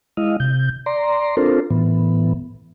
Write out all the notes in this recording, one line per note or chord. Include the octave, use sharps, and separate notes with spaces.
G#3 E4 D#5 F5
C3 G6
D5 A#5 C6
C4 D4 F4 A4 A#4 C5
A2 E3 B3